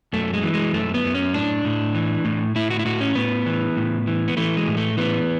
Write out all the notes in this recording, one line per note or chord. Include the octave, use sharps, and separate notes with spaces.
F#2 A3
G#3
E3
G#3
F#2 A3
B3
F#2
C#4
A2 D4
A2
E3
A2
A2 E4
F#4
E4
A2 F#4
C#4
A2 B3
E3
A2
E3
B3
E3 A3
G#3
A2
A3
E3 B3